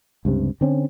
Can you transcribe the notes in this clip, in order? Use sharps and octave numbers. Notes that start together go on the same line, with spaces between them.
C#2 G2 C3
D3 C4 C#4